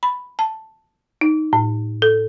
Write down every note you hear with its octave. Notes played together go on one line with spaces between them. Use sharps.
B5
A5
D#4
A2
A4